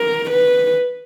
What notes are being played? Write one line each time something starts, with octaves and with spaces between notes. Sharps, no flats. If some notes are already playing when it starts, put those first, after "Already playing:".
Already playing: A#4
B4